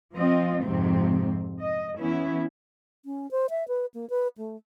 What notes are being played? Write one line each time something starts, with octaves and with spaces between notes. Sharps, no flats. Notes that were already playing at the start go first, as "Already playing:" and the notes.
F3 C4 F4 D#5
F2 G#2 C3 C4
D#5
E3 B3 C#4 E4
C#4
C5
E5
B4
A#3
B4
A3